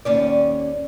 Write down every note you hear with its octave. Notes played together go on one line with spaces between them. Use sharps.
D#2 C#4 D5